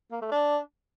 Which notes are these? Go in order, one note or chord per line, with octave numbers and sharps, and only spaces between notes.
A#3
A3
D4